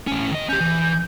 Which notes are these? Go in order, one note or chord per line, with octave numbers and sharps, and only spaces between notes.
A2 C#4
D#3 D#5
C#4 G4 G6
E3